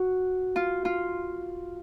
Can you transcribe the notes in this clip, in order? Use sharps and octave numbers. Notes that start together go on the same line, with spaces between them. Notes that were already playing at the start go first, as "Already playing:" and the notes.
Already playing: F#4
F4
F4